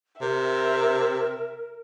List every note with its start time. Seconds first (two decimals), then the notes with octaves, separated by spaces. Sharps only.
0.21 C3 A#4 E5